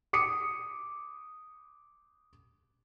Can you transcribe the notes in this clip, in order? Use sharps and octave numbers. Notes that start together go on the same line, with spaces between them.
D6 D#6 C#7